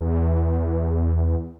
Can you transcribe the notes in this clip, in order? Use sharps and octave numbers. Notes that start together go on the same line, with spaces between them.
E2